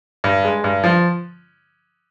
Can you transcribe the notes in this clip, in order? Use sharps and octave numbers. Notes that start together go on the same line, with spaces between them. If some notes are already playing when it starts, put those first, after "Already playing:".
G2
G#3
G2
F3